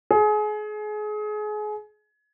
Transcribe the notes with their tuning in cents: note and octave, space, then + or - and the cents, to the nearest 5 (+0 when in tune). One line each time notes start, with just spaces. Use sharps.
G#4 +30